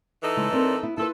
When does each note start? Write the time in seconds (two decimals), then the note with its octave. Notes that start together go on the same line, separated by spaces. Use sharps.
0.23 E3 D#4 A4
0.37 C#3 G#3 E4
0.52 C4 A#4 D5
0.83 B3 E4
0.98 E4 F4 A4 B4